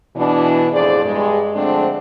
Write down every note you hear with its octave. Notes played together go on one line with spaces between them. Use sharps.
B2 E3 D4
F2 A2 G#4 C5 D5
G2 G#3
D3 F3 G#3 A3 C4 D4